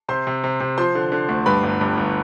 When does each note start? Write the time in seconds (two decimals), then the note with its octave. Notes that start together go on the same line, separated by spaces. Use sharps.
0.09 C3 C5 C6
0.27 C3
0.44 C3
0.60 C3
0.78 F3 C5 C6
0.95 D3
1.12 D3
1.29 D2
1.46 G2 B4 B5
1.63 G1
1.81 G2
1.97 G1